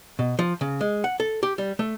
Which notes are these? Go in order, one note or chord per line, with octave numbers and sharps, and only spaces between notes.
B2
F3
C#3
G#3
F#5
A4
G4
G3
A3